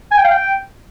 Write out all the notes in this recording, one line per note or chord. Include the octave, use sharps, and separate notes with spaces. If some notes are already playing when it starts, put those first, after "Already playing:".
G#5
G5
F5
G5